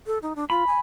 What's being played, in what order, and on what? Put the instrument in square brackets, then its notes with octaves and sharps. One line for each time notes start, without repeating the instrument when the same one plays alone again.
[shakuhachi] A4
D#4
D4
[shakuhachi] F4 [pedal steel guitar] B5
[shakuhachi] G#5